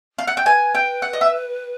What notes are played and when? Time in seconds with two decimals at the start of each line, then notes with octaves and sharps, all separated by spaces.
0.18 F5
0.27 F#5
0.37 G5
0.46 B4 G#5
0.75 G5
1.02 F#5
1.13 D#5
1.21 E5